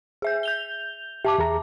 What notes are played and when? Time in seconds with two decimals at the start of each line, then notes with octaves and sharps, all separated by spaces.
0.22 G#4 E5 G6
0.43 G6 F7 G7
1.25 G4 E5 A5 D6
1.38 E2 G#4 A#5